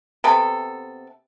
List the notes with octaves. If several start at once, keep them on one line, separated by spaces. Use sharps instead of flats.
C3 B3 A4